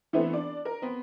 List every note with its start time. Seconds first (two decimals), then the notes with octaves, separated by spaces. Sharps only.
0.13 E3 A3 B3 C4 D4 E4
0.33 D4 D5
0.65 A#4
0.82 B3 C4